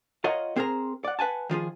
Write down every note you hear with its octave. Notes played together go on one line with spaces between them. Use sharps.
F4 A#4 C#5 D#5 F5 F#5
C4 G#4 A#4 C5 A#5
D5 F#5
B4 F#5 G#5 A5
D#3 F3 F4 G#4